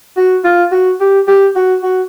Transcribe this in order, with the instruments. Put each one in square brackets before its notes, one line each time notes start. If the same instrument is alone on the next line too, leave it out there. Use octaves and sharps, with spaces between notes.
[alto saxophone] F#4
F4
F#4
G4
G4
F#4
F#4